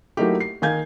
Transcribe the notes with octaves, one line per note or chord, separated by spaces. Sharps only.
F#3 A3 A#3 D#4 E4 G4
C7
D#3 A#3 F5 G#5 G6 G#6